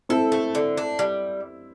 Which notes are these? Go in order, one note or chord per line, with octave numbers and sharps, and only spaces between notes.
C4 E4 A4
A3
D3
D4
G3